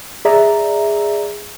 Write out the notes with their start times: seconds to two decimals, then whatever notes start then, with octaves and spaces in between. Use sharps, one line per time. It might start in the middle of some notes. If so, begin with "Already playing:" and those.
0.25 G#4 D5 E5 A#5